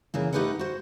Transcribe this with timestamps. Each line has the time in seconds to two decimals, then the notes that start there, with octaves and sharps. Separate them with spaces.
0.14 C#3 E3 A#3
0.33 A3 D#4 G4 B4 D#5 F#5
0.59 F#4 C5